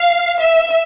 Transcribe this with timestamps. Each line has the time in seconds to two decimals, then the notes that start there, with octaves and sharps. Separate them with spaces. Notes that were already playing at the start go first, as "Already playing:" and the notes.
Already playing: F5
0.40 E5